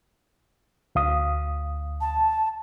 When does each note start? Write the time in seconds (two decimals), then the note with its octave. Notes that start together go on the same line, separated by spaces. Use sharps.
0.95 D2 F5 D#6
2.01 A5